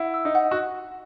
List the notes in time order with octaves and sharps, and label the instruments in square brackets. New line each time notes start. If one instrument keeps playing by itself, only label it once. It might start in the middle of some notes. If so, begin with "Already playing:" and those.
Already playing: [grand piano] E4 [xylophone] F#5
[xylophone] E6
[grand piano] D#4
[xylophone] F#5
[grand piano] F#4